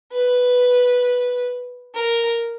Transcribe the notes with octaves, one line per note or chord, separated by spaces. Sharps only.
B4
A#4